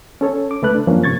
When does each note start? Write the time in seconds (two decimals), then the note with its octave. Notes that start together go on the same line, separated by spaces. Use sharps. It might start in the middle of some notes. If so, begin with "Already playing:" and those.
0.21 C#4 A4 C#5
0.51 D6
0.62 C#2 A3 A4 B4 F#6
0.75 D4
0.87 F#2 F3 A#3 C#4
1.04 G2 C3 C#6 G#6 A6